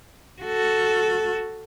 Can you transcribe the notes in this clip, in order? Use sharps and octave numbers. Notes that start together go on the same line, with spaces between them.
F#4 A4